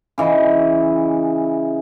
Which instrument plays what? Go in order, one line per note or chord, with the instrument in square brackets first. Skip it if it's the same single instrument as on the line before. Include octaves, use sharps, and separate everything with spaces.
[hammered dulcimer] C#3 E3 D#5